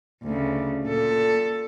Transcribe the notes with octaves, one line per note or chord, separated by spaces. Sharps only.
D2 C#3
A#2 A4